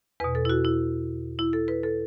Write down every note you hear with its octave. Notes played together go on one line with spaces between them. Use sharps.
E2 B2 B4
A4
E4
F#4
E4
E4
A4
B4
A4